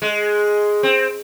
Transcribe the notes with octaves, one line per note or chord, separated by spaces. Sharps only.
G#3
C4